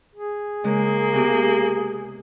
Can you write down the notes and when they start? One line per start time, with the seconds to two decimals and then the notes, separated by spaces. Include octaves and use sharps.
0.16 G#4
0.64 C#3 G#3 A#3
1.12 C3 B3 G4